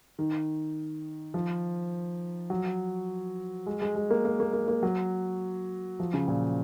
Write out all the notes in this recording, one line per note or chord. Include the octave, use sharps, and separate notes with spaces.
D#3
F3
F#3
G#3
G#3
G#3
A#3
A#3
A#3
A#3
A#3
F#3
F3
C#3
A#2